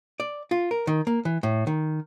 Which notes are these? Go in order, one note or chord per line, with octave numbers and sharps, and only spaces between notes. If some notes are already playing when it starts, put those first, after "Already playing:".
D5
F4
A#4
D#3
A#3
E3
A2
D#3